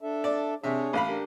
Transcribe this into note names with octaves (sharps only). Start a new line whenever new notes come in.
D4 A4 E5
D5
C3 D4 G#4 C#5 E5
A1 F5 B5
D4 G4 A#4